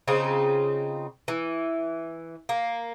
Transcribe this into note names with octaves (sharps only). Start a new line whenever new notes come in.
C#3 C4 D#4 F4
E3
A#3